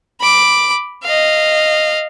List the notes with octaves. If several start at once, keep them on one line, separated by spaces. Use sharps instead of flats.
B5 D6
D#5 F5